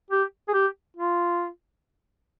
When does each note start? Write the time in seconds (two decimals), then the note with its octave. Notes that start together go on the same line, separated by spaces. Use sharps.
0.11 G4
0.48 G#4
0.54 G4
0.97 F4